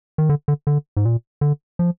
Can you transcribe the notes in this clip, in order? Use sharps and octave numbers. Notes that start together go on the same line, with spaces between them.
D#3
D3
D3
D3
G#2
A#2
D3
F3